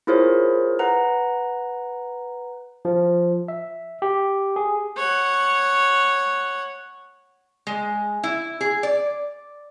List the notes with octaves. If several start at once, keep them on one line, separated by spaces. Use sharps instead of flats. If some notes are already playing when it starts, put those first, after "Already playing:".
E4 F4 G#4 A#4 C5 C#5
B4 F#5 A#5
F3
E5
G4
G#4
C#5 F#5
G#3
E4
G#4
D5